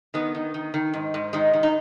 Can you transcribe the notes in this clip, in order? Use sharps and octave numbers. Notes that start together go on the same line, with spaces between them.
D#3 B3
D#3
D#3
D#3
G#2
G#2
D#3 G#3
D#3
D#4